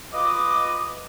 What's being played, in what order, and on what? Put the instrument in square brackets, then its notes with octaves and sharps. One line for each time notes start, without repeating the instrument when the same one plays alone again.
[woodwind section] F4 D6 [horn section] B4 D#5